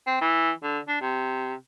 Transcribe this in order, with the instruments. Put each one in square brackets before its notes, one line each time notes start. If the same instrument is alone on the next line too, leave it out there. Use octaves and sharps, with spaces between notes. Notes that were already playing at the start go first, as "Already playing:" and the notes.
[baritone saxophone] C4
E3
D3
D4
C3